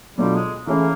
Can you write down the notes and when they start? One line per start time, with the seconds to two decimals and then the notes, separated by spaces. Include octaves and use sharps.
0.18 B2 F#3 G3 A3 D4 F4
0.35 G#3
0.67 E3 A3 A#3 C#4 E4 G#4